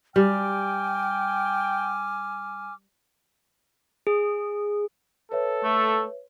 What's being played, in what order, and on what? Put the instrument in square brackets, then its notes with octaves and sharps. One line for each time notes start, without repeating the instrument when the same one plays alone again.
[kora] G3 [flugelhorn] G5 [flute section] G#5 D6 F6
[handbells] G#4
[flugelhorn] A4 [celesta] B4 C#5 E5
[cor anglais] A3